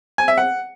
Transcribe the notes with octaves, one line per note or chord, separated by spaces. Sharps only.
G#5
E5
F#5